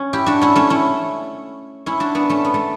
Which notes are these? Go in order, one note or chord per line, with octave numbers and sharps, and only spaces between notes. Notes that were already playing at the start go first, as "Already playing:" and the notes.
Already playing: C#4
E4 G4
D4 F#4
C#4 E4
A3 C#4
C#4 E4
C#4 E4
D4 F#4
B3 D4
A3 C#4
B3
A3